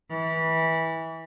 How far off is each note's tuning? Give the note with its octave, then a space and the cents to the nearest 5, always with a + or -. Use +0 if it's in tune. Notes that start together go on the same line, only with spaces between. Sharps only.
E3 -20